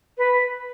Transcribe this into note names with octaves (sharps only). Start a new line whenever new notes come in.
B4